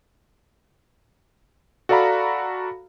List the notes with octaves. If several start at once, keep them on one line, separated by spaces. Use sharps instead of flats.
F#4 A4 D5 F5 A#5 B5